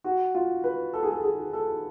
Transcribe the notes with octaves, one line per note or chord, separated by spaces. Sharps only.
F#4
F4
B4
A4
G#4
A4
G#4
A4